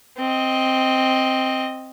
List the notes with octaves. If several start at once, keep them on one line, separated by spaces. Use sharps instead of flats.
C4 D#5